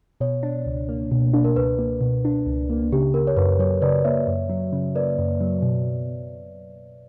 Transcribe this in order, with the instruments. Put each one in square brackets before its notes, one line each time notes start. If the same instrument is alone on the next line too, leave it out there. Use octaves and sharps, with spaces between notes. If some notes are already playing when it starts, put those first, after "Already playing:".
[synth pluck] B2 [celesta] C#5
[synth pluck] D4
C#2
A#3
B2
D4
[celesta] A#4
[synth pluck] C#2 [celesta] B4
[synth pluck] A#3
B2
D4
C#2
A#3
[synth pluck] C#3 [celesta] G4
[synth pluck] A#3 [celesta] A#4
[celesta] C#5
[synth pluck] F#2 [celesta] B4
[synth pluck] F#3 [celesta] C#5
[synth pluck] C#3 [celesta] B4 D5
[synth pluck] A#3 [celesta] C#5 E5
[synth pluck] F#2
F#3
C#3
[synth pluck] A#3 [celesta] B4 D5
[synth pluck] F#2
F#3
B2